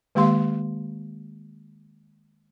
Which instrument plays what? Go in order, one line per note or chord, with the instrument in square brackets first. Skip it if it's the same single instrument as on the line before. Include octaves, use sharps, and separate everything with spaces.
[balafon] D#3 G#3 A#3 G4 F5 C6